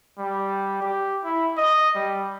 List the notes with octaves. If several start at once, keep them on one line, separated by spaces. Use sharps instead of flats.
G3
G4
E4
D#5
G3